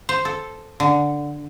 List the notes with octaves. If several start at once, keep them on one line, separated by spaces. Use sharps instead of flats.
C5
A4
D3